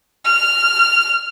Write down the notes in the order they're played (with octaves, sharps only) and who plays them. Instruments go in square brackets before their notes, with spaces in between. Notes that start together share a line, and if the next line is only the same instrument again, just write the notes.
[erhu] F6